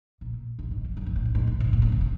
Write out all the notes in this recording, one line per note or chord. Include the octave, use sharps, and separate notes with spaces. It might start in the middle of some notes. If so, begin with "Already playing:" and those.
A#2
A2
G#2
E2
F#2
G#2
A2
A#2
G#2
G#2
A2
A#2
C#3
C#3
C3